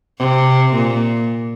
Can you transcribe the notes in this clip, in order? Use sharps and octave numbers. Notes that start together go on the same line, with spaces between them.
C3
A#2